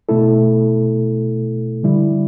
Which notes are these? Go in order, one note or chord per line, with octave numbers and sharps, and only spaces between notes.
B2 A3 E4 A4
D3 G3 E4